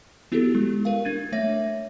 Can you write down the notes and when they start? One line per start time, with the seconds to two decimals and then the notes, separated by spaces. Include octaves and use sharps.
0.32 B3 E4 F#4 G4 A4
0.55 G#3
0.85 A#4 F5
1.05 D4 G#6 A6 D#7
1.32 A3 C#5 E5 A#6